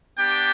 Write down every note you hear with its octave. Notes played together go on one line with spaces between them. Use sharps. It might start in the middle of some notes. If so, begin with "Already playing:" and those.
B3 D4 G4 G5